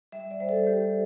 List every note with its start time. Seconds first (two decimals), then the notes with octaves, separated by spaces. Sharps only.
0.12 G3 E5
0.31 D5
0.40 G3 C5
0.49 A4
0.66 G3 G4